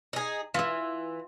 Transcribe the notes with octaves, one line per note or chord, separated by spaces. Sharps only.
D#4 G#4
E3 F4 E5